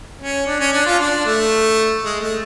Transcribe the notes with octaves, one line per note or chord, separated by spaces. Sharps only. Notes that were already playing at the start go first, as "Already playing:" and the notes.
C#4
D4
C#4
D4
F4
D4
A3
G#3
A3